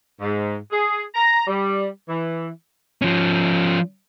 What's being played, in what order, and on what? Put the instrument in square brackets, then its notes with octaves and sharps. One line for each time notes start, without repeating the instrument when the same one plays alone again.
[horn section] G#2
G#4
A#5
G3
E3
[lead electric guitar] F3 C#4